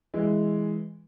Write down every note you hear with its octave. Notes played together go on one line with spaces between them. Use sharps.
E3 G#3